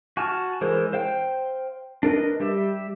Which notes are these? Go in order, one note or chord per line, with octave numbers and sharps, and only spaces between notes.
F#4 G#5 A5 F6
E3 G#3 A#4 C5
C5 F5 G5
D4 A#4 B4 D#5
G3 G4 E5